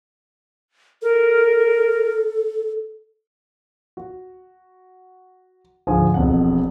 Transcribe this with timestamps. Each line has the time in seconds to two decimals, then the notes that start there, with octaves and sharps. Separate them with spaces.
1.02 A4 A#4
3.97 F#4
5.87 D2 G#2 F3 G#5
6.14 E1 F2 F#5